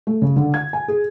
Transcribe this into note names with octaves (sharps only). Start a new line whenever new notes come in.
A3
C#3
D3
G#6
G#5
G#4